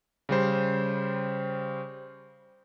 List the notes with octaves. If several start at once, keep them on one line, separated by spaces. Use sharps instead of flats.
C#3 G3 C5